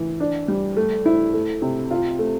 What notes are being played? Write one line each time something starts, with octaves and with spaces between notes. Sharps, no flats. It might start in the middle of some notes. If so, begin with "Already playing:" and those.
Already playing: E3
D4
G3
A3
E4
A3
C3
F4
A3